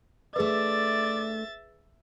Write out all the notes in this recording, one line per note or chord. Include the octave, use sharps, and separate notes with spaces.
A3 D4 G#4 B4 D5 E5 A6